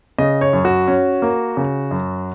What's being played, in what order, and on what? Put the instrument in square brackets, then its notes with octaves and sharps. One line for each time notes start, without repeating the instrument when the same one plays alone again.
[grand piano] C#3 D#5
C#5
F#2
F#4
C#4
A#3
C#3
F#2